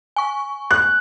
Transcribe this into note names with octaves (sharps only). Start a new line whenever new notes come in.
G#5 C#6
F#6